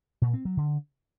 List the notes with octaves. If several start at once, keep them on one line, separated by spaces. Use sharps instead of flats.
A#2
C4
F#3
D3